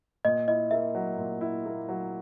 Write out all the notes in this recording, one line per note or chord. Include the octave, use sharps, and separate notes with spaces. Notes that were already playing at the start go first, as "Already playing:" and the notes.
A#2 D#5
E4 D#5
A#3 E5
F#3
A#2
E4
A#3
F#3